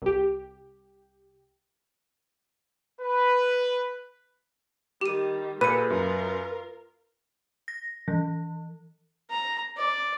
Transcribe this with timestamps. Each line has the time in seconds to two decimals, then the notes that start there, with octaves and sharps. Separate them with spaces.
0.02 C2 G4
3.01 B4
5.01 D#3 G3 G4 D#7
5.61 A#2 G#4 A4 B4 C#7 D#7
5.90 F#2 F4 A#4
7.68 A#6
8.08 E3
9.30 A#5
9.77 D5